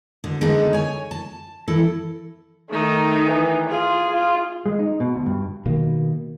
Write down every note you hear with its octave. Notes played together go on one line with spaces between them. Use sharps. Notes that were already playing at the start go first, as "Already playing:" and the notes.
D2 D3
D3 G#3 B3 D#4 A4
C#5 G#5
A5
E3 E4 A4
D#3 A3 D#4
E3
F4 G#4
F4
G#3
D#4
B2
D2
G2
B2 D#3 A#3